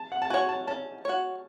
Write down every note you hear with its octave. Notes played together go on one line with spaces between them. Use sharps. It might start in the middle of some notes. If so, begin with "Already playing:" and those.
Already playing: A5
F#5
A5
F#4 C#5 G#5
A5
C#4 A5
F#4 C#5